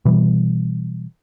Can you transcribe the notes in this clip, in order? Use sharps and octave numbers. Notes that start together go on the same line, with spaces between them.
B2 E3 G3